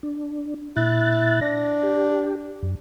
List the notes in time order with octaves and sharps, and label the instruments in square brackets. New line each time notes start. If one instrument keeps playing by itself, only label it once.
[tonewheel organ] D4
[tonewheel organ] A#2 F#6 A6 [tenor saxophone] E4
[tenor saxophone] D4 [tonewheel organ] A#6
[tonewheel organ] G4
F#2